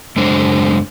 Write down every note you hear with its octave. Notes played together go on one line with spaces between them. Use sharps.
F#2 C#3 G#3 D4 C5